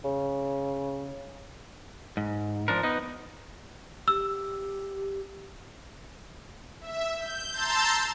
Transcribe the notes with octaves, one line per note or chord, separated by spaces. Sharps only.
C#3
G#2
F3 D4 A#4
B3 D#4
G4 E6
E5
G6
A5 A#5 C6 E6 G6 A6